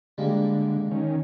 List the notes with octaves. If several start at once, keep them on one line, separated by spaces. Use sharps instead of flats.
D3 G3 G#3 A#3
D#3 C#4